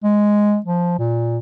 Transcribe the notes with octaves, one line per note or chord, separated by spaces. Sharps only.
G#3
F3
A#2